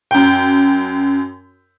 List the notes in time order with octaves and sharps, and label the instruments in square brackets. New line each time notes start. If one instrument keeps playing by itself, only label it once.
[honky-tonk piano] F#2 G5